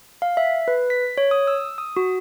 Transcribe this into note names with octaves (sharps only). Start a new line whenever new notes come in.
F5
E5
B4
B6
C#5
D#6
E6
D#6
F#4